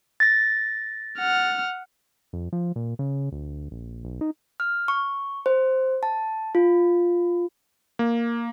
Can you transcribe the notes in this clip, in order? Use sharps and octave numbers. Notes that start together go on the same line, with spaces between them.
A6 A#6
F#5 F6
F2
F3
A#2
C#3
D2
A#1
B1
D#4
F6
C#6
C5
A5
F4
A#3